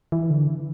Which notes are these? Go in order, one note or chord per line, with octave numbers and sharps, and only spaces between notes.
E3
D3
E3